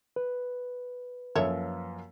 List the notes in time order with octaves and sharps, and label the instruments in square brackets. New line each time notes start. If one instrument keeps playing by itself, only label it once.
[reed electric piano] B4
[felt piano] F#2 F3 A#3 [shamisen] A4 C#5 E5